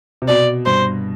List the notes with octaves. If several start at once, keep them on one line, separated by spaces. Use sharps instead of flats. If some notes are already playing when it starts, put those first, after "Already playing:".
C3
B2 D5
G2 C5